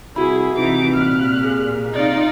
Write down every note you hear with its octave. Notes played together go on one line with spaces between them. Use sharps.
C2 E4 F#4 G#4 B5
C3 E3 D#4 D6
A#2 F6 F#6
G#4
C3 D#4 F4 D5